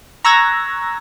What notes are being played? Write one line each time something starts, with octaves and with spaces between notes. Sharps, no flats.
A#5 C#6 E6 F#6 G#6 A#6